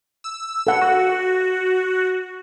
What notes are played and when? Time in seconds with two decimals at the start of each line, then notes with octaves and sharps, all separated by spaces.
0.24 E6
0.67 A4 F#5
0.81 F#4